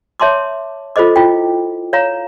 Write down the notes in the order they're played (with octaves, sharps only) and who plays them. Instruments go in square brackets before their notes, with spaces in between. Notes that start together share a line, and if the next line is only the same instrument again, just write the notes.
[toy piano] C#5 E5 A5 C6 D6
F4 A4 C5 D#5 D6
E4 F4 G5
C#5 F5 A#5